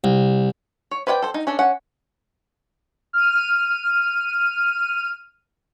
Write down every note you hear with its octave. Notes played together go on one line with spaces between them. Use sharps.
C2
C#5
B4 C5 D5 F#5 G5
A4 C5
D#4
C#4 D4 A4
C#4 F#5
F6 D#7